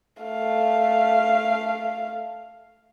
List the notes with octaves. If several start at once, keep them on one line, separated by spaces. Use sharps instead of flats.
A3 F5